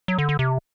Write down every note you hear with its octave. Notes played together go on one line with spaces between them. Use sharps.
F#3
D3
D3
C3